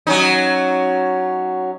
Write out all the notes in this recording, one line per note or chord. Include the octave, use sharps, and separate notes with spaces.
F#3 C#4 D#4